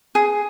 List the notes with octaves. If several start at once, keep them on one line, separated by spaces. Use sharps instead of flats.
G#4